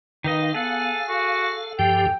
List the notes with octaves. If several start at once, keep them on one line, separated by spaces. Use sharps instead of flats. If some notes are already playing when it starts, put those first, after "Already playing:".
D#3 D#4 B4 D#5 F5
B3 G#4 A4 F#5
F#4 A4
G2 F3 G4 G5